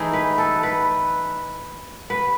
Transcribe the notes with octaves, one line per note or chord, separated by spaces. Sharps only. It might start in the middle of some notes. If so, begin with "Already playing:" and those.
Already playing: E3 A3 D#4 G#4
B4
A4
B4
B4